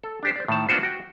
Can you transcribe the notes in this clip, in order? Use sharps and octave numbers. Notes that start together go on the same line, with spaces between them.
A4
D4 G4 C5
C5 D5
A2 D#3 A5
A#3 B3 D4 F4 F#4 C5
F#4 G5